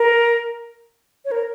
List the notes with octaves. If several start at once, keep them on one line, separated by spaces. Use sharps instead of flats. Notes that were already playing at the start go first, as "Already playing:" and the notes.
Already playing: A#4
C#5
A#4